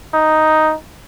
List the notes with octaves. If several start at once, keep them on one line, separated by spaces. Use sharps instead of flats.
D#4